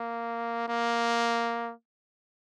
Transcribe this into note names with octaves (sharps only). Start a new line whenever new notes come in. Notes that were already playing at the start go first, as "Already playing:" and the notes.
Already playing: A#3
A#3